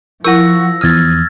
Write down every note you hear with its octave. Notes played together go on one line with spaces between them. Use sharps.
F3 E4 A#4 F#5 C#6 E6 A#6
E2 D#6 F6 G#6 A6